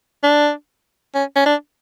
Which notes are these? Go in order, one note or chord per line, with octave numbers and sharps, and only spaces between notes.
D4
C#4
C#4
D4